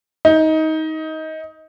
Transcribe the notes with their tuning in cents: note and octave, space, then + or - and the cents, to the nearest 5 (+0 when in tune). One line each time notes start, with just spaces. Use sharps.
D#4 +20